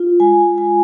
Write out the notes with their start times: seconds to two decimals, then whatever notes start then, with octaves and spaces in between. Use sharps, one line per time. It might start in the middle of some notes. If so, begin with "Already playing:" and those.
Already playing: F4
0.20 G#3 G#5
0.58 G#3 G#5